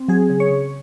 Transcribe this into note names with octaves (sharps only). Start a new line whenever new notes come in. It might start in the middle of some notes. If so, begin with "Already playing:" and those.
Already playing: C4
F#3 G#4
C#3
C#5
C#3